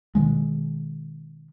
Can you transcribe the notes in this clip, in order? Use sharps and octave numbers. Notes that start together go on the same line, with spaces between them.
B2 D#3 G#3